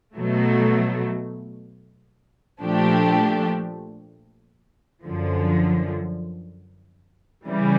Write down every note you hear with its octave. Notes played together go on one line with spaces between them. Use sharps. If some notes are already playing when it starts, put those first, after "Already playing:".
B2 F#3 A3
A#2 F3 A3 D4 G4
F#2 D3 F3
C#3 E3 G3